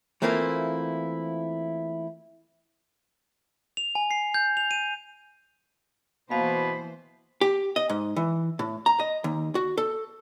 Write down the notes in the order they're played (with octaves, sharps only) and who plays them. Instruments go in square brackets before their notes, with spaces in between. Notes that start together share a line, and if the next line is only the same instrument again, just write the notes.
[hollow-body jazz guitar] E3 A3 A#3 C4 E4 F4
[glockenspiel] F7
G#5
C7
G6
F7
D#7
[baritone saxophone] B2 [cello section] E3 C5 [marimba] A#3 F5 [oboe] B5
[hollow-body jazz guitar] G4
D#5
G#2
E3
A2
A#5
D#5
D#2
F#4
A4